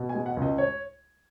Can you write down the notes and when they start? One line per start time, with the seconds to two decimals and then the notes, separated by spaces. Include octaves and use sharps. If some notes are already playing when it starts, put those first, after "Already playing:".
Already playing: B2
0.09 G#5
0.15 G#3
0.26 F#5
0.37 C#2
0.42 D#5
0.58 C#5